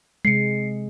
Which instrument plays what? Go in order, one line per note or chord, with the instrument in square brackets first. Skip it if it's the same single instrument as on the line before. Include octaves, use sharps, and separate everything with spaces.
[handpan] C3 G#3 [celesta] C7 C#7